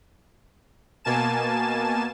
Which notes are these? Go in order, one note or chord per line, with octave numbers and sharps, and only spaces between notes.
B2 A#3 G#5 A5 A6 E7